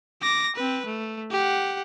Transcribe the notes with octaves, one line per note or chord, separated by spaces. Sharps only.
D6 A#6
C4 B4
A3
G4 F#5